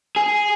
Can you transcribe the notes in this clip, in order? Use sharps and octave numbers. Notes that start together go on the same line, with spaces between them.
G#4